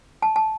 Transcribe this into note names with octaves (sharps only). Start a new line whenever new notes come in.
A5
A5